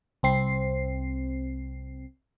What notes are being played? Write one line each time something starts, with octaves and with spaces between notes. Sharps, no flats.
C2 C4 C7